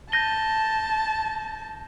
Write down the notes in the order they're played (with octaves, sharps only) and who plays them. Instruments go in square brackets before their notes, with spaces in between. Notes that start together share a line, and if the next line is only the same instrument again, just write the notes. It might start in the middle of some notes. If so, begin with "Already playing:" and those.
[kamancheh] A5 [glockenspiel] G6 A#6 D#7 G7